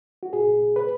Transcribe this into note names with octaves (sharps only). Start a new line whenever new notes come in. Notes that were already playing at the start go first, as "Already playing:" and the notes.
F#4
A#2 G#4
A#2
A#2
A#2 B4